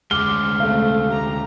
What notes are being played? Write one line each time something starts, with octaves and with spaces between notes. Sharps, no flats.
D2 G#3 D6 F6 G7
A3 C4 F5
G4 A#5